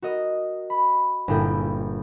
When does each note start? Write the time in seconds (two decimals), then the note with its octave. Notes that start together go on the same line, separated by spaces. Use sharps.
0.02 F#4 A#4 D#5
0.70 B5
1.28 G1 A#2 A#3 E4 G#4 G5